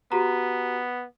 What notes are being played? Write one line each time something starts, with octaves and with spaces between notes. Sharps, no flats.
B3 F#4 G4 A#5